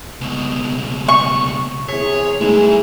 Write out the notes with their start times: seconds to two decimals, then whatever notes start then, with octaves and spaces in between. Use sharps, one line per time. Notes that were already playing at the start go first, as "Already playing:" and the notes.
0.21 C#2 B2
1.08 C#6
1.89 C3 E3 G#4 C#5 B6
2.41 G2 E3 G#3 A3 D#4 E4 G#4